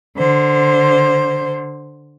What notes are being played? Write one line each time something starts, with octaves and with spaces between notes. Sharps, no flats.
D3 C5